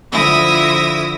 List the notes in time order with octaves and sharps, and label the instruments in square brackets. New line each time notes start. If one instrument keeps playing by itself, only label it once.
[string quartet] D3 F3 E4 E5 D#6 A#6